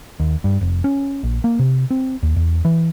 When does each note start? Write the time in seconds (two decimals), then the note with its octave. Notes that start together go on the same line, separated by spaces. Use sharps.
0.20 D#2
0.44 G2
0.61 F1
0.84 C#4
1.23 A#1
1.44 A#3
1.59 C3
1.91 C4
2.23 D#2
2.36 E2
2.65 E3